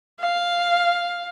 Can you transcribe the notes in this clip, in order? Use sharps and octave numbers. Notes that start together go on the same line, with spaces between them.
F5